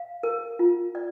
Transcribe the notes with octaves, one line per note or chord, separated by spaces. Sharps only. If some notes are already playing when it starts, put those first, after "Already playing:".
Already playing: F5
A#4
F4
D5